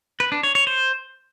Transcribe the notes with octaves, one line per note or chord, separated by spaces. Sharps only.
B4
D4
C#5
C#5
C5